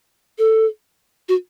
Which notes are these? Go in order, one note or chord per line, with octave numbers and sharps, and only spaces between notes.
A4
F#4